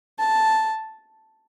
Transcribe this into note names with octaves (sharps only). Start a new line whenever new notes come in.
A5